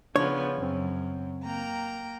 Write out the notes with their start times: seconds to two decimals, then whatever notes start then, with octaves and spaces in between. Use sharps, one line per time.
0.16 C#3 F3 B3 D4 C#5
0.58 F#2 C#3 C4
1.44 A#3 G5 A#5